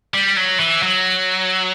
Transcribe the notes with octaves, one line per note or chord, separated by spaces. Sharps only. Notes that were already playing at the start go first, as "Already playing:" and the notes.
G3
F#3
E3
F#3